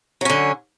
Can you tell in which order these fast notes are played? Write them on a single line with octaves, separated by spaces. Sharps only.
F#3 C#4 D3